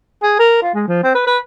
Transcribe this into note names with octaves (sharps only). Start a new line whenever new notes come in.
G#4
A#4
F4
G#3
F3
C4
B4
B4